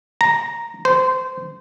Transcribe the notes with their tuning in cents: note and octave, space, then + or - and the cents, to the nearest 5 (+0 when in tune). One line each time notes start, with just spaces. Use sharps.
A#5 +0
C5 -20